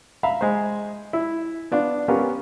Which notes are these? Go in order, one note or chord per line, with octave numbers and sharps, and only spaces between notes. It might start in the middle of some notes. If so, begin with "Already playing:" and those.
E5 F5 A#5 B5
G#3 C5
E4
B3 D4 F4
B3 C#4 F4 G4 A#4